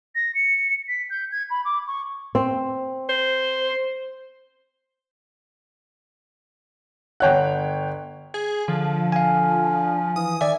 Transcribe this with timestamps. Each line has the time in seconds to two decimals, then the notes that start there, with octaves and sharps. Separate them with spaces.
0.15 A#6
0.35 C#7
0.88 B6
1.10 G6
1.31 G#6
1.50 B5
1.65 D6
1.87 C#6
2.35 C4
3.09 C5
7.20 G1 C#5 F#5 G5 F#6
8.34 G#4
8.68 D3 F3
9.12 F5 G#5
10.16 E3 D#6
10.41 D#3 D5 E5 G#5